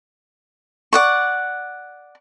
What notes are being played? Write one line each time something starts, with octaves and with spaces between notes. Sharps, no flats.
D5 F#5 C#6